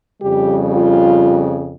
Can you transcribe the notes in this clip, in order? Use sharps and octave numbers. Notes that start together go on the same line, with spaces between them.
F2 C#3 G3 G4
F4